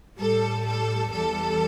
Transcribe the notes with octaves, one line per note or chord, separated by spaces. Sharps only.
A2 G3 A4
A4
E2 E3 G3 A4